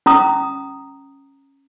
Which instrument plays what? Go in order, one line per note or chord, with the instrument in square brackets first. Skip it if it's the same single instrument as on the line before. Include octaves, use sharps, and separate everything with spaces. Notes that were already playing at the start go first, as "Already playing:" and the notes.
[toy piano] C#4 A#5 D#6